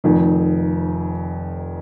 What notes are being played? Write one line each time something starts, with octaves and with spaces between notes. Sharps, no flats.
F1 F2 D#3